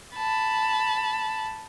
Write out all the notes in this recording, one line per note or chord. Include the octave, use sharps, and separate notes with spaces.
A5 B5